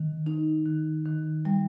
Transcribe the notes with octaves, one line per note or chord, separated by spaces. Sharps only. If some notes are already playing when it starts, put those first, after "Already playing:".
Already playing: D#3
D#4
D#3
D#3
G3